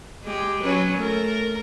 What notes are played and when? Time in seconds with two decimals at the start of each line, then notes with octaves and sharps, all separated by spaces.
0.24 G#3 G4
0.62 F#3 C#4 B4
0.98 A3 A#4